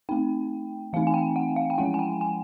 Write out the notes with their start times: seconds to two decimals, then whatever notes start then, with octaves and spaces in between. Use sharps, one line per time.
0.09 A3 C4 D#4 G5
0.93 E3 A3 C4 D#4 F5
1.07 G#5
1.14 G5
1.36 F#5
1.56 F5
1.70 G5
1.78 F3 G#3 C#4 E4 F#5
1.94 G#5
1.99 G5
2.21 G#5